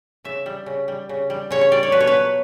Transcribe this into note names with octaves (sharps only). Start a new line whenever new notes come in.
C#3 E5
G3
C#3
G3
C#3
G3
C#3 C#5
C#5
G3 D5
C#5
B2 B4
C#5
B4
F#3